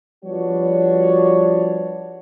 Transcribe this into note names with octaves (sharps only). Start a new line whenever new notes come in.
F3 G3 B3 D4 F#4 C#5